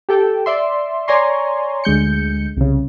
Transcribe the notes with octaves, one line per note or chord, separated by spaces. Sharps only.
G4 A4 G5
D5 E5 C6
C#5 D5 G#5 A#5 C6 C#6
D2 G#3 G6 C#7
C2 C#3